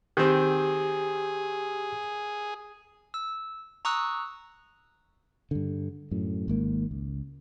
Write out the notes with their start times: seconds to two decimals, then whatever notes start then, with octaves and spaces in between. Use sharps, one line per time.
0.17 D#3 C4 G4 G#4
3.14 E6
3.85 A#5 C#6 D#6 E6 F#6
5.51 G2 D3
6.11 F#2 A2
6.48 G#1 G#2 A#3
6.91 C#2